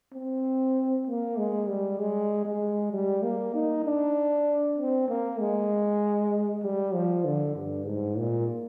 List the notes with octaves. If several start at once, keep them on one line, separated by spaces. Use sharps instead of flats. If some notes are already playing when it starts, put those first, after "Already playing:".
C4
A#3
G#3
G3
G#3
G#3
G3
A#3
D#4
D4
C4
A#3
G#3
G3
F3
D3
G2
G#2
A#2